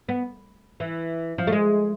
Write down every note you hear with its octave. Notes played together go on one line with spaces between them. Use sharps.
B3
E3
F3
A3
G#3